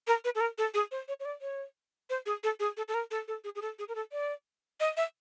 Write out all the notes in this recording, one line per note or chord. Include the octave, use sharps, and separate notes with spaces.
A#4
B4
A4
A#4
A4
G#4
C5
C#5
C#5
D5
C#5
C5
G#4
A4
G#4
A4
A4
A#4
A4
A4
G#4
G#4
A4
G#4
A#4
A4
D5
D#5
E5